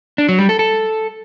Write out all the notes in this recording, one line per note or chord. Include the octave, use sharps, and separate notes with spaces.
D4
F#3
G3
A4
A4